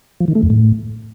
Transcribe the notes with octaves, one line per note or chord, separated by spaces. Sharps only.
F3
D#3
A3
F2
A2